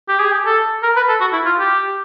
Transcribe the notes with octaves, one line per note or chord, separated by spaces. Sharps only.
G4
G#4
G4
A4
A#4
B4
A4
F#4
E4
F4
G4